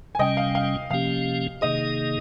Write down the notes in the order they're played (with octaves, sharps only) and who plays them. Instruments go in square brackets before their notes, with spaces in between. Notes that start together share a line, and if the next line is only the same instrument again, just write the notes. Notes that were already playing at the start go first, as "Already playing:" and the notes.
[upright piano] G#5
[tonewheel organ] C3 G3 C#4 [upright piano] D#5 G5
[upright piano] F5
F5
[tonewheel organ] C3 F3 A#3 C#4 G4 [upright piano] F5
[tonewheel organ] C3 D#3 A#3 D#4 G#4 [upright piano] D#5